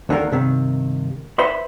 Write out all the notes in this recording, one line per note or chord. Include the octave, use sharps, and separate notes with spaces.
D2 D3 D#3 A#3 A#4
G2 C3 D#3
B4 C5 E5 B5 C6